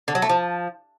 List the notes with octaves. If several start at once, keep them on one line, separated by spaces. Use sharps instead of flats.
D3
F#3
A3
F3